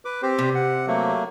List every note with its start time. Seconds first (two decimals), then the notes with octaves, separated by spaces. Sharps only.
0.05 B4 D6
0.22 C4 G4 C5
0.39 C3
0.55 F#5
0.87 F#3 A3 A#3